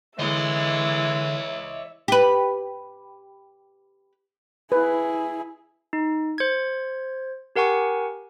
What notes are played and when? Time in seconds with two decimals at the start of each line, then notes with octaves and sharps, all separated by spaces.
0.19 D3 E3 G#3 C#5 D#5 E5
2.08 G4 B4
4.72 E4 G#4 B4
5.93 D#4
6.38 C5 G#6
7.56 G4 A#4 F#5 G#5 C#6